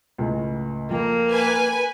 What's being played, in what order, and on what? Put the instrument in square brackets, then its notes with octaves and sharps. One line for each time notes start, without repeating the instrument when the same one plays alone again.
[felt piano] C#2 A2 C#3
[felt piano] F2 [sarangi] A#3
[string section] B4 G#5